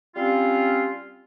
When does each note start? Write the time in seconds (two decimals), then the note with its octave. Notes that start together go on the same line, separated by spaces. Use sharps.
0.16 G3 C4 C#4 F4